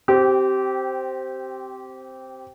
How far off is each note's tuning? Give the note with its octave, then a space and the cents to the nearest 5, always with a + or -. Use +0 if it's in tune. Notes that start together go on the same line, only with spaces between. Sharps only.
C4 +0 G4 -20